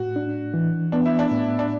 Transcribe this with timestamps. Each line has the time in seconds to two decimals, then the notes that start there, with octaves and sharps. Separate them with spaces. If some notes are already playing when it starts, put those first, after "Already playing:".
Already playing: A2 F#4
0.16 D4
0.54 E3
0.92 B3 D4
1.06 E4
1.19 D4
1.32 A2
1.59 D4